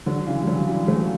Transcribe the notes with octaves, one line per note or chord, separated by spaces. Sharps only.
D3 F#3
C#3 E3
G3
D3 F#3
E3 G3
F#3 A3